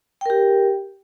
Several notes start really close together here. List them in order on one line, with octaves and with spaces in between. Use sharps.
G5 A#4 G4